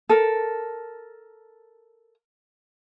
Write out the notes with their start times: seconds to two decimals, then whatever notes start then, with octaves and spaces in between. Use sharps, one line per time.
0.09 A4 A#4